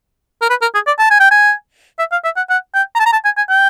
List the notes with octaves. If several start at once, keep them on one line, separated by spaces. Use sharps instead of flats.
A#4
B4
A#4
G#4
D5
A5
G#5
G5
G#5
E5
F5
E5
F#5
F#5
G5
A#5
A5
A#5
A5
G#5
G#5
G5